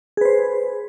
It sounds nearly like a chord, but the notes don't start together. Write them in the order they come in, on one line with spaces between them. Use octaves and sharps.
G#4 B4 C5